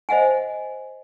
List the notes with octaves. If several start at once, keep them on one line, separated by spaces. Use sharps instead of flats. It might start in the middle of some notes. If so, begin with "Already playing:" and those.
C5 D#5 E5 F#5 G#5